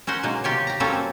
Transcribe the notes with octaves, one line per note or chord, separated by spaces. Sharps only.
C#4 A#4 C5 F#5
B2 F#3 G#3 A#3
C3 F4 G4 C#5
G4 A#5
F#3 G3 A#3 C4 C#4 A4
C4